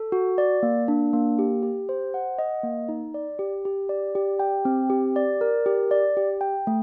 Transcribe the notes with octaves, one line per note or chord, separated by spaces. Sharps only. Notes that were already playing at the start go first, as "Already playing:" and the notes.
Already playing: A4
F#4
D5
A#3
D4
A#3
G4
G4
C5
F#5
D#5
A#3
D#4
D5
G4
G4
D5
G4
G5
C4
G4
D5
A#4
G4
D5
G4
G5
A3